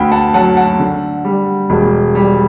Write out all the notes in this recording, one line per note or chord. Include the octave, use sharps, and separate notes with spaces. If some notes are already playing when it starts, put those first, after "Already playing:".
Already playing: D2 G5 B5
F#5 A5
F#3 F#5 A5
F#5 A5
D3
G3
E1
G3